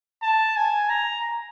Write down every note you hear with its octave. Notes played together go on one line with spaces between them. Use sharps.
A5
G#5
A#5